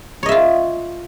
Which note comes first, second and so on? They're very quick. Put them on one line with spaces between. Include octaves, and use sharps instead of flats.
C#5 D#5 E5 F4